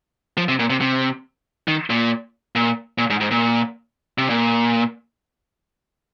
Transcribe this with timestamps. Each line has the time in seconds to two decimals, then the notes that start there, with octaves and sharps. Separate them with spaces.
0.37 F3
0.49 C3
0.59 A#2
0.70 C3
0.81 C3
1.68 D#3
1.90 A#2
2.56 A#2
2.98 A#2
3.10 G#2
3.21 G#2
3.31 A#2
4.18 C3
4.30 A#2